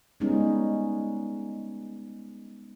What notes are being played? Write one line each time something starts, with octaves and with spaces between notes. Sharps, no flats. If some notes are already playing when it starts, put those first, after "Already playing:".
G3 G#3 B3 C#4 D#4